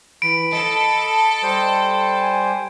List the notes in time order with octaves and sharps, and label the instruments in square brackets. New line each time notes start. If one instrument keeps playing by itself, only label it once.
[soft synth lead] E3 [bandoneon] B5 [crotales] D7
[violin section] A4 [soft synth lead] D#5
[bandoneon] G3 C5
[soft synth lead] G#5